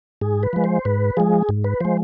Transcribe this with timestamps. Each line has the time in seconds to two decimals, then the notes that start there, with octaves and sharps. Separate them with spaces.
0.21 G#2 G#4
0.43 B4
0.53 F3 G#3
0.64 C5
0.85 G#2 B4
1.17 F3 G#3 G#4
1.49 G#2
1.64 B4
1.81 F3 G#3 C5